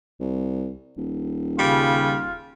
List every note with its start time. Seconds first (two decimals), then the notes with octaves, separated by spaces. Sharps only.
0.20 C2
0.97 D#1
1.59 C#3 G3 F4